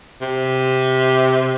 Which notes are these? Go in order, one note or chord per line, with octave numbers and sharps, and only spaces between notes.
C3